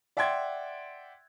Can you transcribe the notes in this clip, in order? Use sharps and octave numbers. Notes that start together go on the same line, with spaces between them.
D5 E5 F#5 G5 C6 G#6